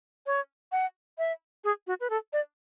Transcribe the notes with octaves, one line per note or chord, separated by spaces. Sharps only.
C#5
F#5
E5
G#4
F#4
B4
A4
D5